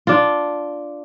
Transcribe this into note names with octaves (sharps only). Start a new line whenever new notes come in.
D4 F4